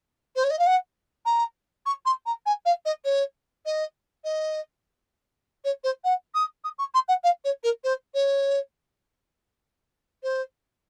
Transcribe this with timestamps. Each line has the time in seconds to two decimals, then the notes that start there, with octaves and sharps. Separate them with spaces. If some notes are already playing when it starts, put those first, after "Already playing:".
0.35 C5
0.44 C#5
0.50 D#5
0.59 F5
0.66 F#5
1.25 A#5
1.86 C#6
2.05 C6
2.26 A#5
2.46 G#5
2.65 F5
2.85 D#5
3.04 C#5
3.65 D#5
4.24 D#5
5.64 C#5
5.83 C5
6.04 F#5
6.34 D#6
6.64 D#6
6.78 C#6
6.94 C6
7.08 F#5
7.23 F5
7.44 C#5
7.63 A#4
7.84 C5
8.14 C#5
10.23 C5